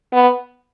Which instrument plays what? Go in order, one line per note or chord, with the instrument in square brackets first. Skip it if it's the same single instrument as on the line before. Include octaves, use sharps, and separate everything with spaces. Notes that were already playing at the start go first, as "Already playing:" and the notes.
[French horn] B3